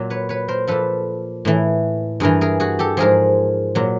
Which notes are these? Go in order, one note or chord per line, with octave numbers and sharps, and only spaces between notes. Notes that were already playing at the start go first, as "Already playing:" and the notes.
Already playing: A#2 F#3
B4 C#5
B4 C#5
A#4 C5
A#2 F3 A4 B4
A2 E3
G2 E3 G#4 A#4
G#4 A#4
F#4 G#4
G4 A4
G#2 F3 G#4 A#4
A#2 F#3